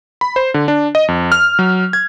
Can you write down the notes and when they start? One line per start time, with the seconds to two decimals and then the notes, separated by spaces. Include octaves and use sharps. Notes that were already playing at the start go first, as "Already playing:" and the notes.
0.21 B5
0.36 C5
0.54 D3
0.68 D4
0.95 D#5
1.08 F2
1.32 F6
1.59 F#3
1.93 G#6